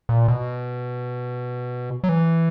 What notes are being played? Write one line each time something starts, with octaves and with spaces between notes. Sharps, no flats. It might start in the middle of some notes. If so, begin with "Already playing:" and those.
A#2
B2
F#3
E3